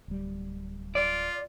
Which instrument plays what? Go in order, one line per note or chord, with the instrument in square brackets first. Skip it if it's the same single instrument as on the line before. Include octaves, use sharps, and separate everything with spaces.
[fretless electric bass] D1 G3
[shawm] F4 [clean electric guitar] D5